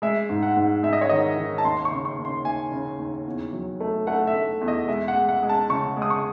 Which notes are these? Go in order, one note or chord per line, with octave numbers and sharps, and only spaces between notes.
G#3 E5
G#2
F#5
G#2
G#3 E5
D#5
C#5
D#3 D#5
D#3
A5
D#2 C6
C#6
C#3
C#6
D#2
C6
D#2 G#5
C#3
D#2
E2
F#3
A3
A3 F#5
E5
A3
E2
D#5
G#3 E5
F#5
G#3
F#5
G#3
A5
C#3 C#6
G#3
D#6
C#6